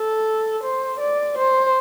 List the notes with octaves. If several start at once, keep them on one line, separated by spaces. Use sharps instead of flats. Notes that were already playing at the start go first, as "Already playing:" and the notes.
Already playing: A4
C5
D5
C5